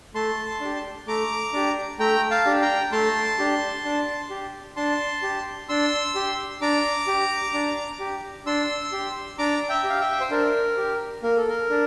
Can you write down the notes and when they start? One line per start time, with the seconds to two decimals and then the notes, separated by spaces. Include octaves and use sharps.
0.14 A3 A5 C6
0.61 D4 G4
1.07 A3 A#5 D6
1.53 D4 G4
1.99 A3 G5 A#5
2.31 F5 A5
2.46 D4 G4
2.61 G5 A#5
2.92 A3 A5 C6
3.39 D4 G4
3.84 D4
4.30 G4
4.76 D4 A5 C6
5.23 G4
5.69 D4 C6 E6
6.15 G4
6.61 D4 A#5 D6
7.07 G4
7.54 D4
7.99 G4
8.46 D4 C6 E6
8.92 G4
9.38 D4 A#5 D6
9.69 E5 G5
9.84 G4 F5
10.00 E5 G5
10.20 C5
10.31 D4 A#4
10.77 G4
11.23 A#3 A#4
11.37 A4
11.48 A#4
11.70 D4